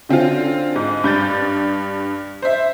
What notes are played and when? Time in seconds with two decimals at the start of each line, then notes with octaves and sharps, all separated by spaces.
0.09 D3 C4 C#4 F4
0.76 G#2
1.04 G2 G6 A6
2.42 C5 E5